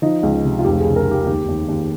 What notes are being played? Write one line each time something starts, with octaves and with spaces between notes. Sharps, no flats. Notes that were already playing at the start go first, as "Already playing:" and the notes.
F3 D#4
C#2
C3
F4
F1 G4
G#4
C#3
A#4
F1 G4
D#2 G4
D#2
D#2